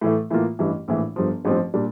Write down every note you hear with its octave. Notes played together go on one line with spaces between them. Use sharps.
A2 E3 A3
A2 E3 A#3 F4
A1 G2 E3
A#1 A2 E3
G1 G2 F3
A1 G2 F3 C4
A#2 G3 D4